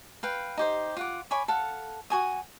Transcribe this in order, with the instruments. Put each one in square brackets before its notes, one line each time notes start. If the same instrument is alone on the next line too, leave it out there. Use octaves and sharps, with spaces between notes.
[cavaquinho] B4 F5 G5
D#4 G4 C5
F4 F#5 D6
C#5 G#5 B5 D6
A4 F5 F#5
F#4 G#5 D#6